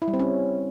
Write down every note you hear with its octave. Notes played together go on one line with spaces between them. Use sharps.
E4
G3
C4
C#4